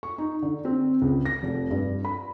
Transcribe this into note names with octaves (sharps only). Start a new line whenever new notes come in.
C#6
D#4
D3
C4
C#2
A#6
F1
G2
B5